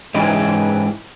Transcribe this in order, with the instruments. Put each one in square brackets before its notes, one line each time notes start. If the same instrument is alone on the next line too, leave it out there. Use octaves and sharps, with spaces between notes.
[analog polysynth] G#2 E3 [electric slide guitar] G#3 C#4 G4